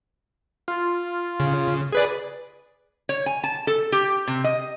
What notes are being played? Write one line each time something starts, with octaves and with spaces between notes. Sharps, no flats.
F4
C#3
G#4 B4 D5
C#5
G#5
A5
A4
G4
C3
D#5